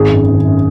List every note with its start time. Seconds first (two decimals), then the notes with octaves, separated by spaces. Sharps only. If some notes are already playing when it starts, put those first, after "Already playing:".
Already playing: G#1 G#4
0.10 F#2
0.28 G#1
0.44 F#2